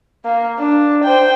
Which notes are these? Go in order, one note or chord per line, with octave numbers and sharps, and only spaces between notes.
A#3
D4
C5 G5